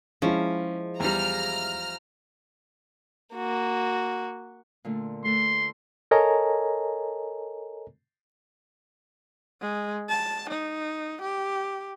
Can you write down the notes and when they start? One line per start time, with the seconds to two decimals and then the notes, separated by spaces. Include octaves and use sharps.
0.22 F3 G#3 C#4 E4
1.00 E2 G3 A#5 F6
3.35 A#3 F#4
4.84 A#2 D3 A3
5.25 A3 A4 B4 C6
6.11 A4 A#4 C#5 D#5 G#5 A#5
9.61 G#3
10.09 A5
10.49 D#4
11.21 G4